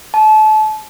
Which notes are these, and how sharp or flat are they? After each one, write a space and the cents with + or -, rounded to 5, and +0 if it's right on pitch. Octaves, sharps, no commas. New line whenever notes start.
A5 -30